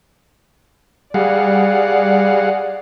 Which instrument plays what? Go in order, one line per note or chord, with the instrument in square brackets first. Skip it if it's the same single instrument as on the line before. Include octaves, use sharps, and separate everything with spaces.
[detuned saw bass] G3 [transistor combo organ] G#4 F5 F#5 [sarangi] D5